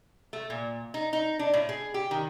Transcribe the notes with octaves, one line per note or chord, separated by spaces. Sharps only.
A3
A#2
D#4
D#4
D4
A2
G#4
G4
D#3